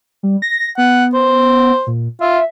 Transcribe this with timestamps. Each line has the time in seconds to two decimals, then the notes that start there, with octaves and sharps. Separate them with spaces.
0.23 G3
0.42 A#6
0.78 B3 F#5
1.14 C5
1.87 A#2
2.21 F4 E5